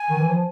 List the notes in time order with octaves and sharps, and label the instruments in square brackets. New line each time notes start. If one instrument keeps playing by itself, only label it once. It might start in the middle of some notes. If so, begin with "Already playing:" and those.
Already playing: [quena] G#5
[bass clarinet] D#3
E3
F3